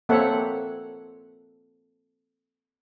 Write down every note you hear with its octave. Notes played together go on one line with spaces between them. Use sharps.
A#3 C4 A4 C#5 E5 F#5